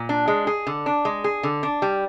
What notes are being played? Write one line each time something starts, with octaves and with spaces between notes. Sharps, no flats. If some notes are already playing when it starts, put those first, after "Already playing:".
Already playing: A#2
D4
G#3
G#4
D3
D4
G#3
G#4
D3
D4
G3